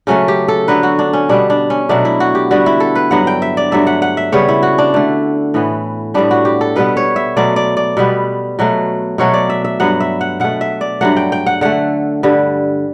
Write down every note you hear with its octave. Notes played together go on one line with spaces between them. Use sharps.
C#3 F#3 A3 C#4
G4
A4
D3 F#3 B3 B4
F#4
D4
C#4
B2 G3 B3 D4
D4
C#4
B2 F#3 A3 D4
E4
F#4
G4
D3 G3 B3 F#4
E4
A4
B4
G2 F#3 B3 F#5
G5
E5
D5
G2 F#3 A3 E5
F#5
F#5
E5
C#3 G3 B3 C#5
E4
F#4
D4
D3 A3
A2 E3 B3
A2 G3 B3 D4
F#4
G4
A4
B2 G3 B3 B4
C#5
E5
B2 F#3 A3 D5
D5
D5
B2 G3 B3
B2 F#3 A3
B2 F#3 A3 C#5
D5
E5
E5
G2 F#3 B3 F#5
E5
F#5
B2 A3 F#5
E5
D5
G2 F#3 A3 F#5
G5
G5
F#5
D3 A3 F#5
G2 D3 G3